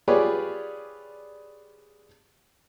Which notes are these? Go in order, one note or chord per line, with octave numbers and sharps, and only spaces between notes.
F4 G4 G#4 B4 C#5 D5